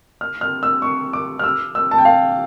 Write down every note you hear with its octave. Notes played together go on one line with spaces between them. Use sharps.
F6
F6
E6
C#6
D6
F6
E6
E6
A5
G5
F5